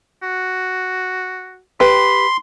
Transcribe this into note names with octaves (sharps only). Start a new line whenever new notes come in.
F#4
G4 B4 B5 C6